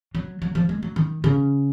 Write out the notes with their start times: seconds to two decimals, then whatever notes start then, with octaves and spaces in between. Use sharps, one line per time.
0.15 F#3
0.42 F#3
0.55 F3
0.69 G#3
0.83 F#3
0.96 D#3
1.24 C#3